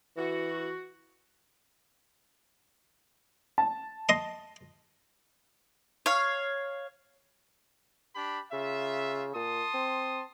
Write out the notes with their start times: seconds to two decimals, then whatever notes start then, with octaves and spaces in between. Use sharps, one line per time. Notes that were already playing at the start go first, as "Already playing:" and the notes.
0.17 E3 F#4
3.58 A5
4.09 D#5 C6
6.06 C#5 F5
8.16 D4 G4 B5
8.52 C#3 F4 E5
9.35 A#2 A5 C6 D#6
9.74 C4